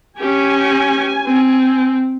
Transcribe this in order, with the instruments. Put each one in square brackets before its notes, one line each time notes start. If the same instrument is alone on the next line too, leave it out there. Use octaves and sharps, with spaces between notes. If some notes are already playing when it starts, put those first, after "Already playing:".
[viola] C#4 G4 [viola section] G#5
[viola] C4